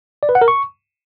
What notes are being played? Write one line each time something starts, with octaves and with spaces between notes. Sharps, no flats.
D5
B4
F#5
A#4
C#6